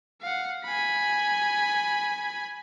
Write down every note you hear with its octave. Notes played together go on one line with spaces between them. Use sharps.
F5 F#5
G#5 B5